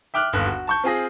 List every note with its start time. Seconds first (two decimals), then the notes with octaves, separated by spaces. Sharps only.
0.14 E5 G5 D6 F6 F#6
0.33 G1 D#2 F#6
0.47 F#4
0.67 A5 C#6 G6
0.84 C4 F4 G#4 A#6